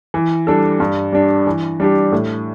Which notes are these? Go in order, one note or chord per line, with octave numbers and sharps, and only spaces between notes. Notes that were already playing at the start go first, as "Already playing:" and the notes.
E3
G3 D4 A4
G2
G3 D4
E3
G3 D4 G4
A2